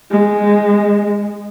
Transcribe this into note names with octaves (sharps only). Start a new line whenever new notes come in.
G#3